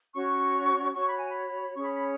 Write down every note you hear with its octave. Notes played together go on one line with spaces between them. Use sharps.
C#4 F#4 C#5 C#6
F#4 C#5 C#6
B5
G#5
B5
C#4 G#4 C#5 C#6
B5
B5